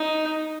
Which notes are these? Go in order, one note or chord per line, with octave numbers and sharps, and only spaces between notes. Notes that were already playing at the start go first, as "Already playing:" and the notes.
Already playing: D#4